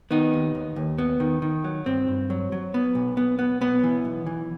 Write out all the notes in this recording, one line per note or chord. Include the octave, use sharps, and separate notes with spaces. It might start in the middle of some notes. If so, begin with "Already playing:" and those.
D#3 B3 D#4
D#2
D#2
D#2
B3
D#3
D#3
F#3
G2 C4
G2
F#3
F#3
B3
B1
B3
B3
B1 B3
E3
B1
E3